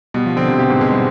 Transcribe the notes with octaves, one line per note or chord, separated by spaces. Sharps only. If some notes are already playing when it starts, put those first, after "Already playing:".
B2 G3
F3
D3 C4
C3
B2 G4
G#2
B2 G#3
G3